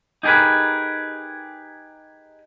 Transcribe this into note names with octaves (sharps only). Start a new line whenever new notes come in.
D#4 G4 G#4 A#4 B4